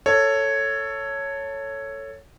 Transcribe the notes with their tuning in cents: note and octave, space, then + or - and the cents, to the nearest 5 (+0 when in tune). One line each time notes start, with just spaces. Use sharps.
A4 +15 C#5 +0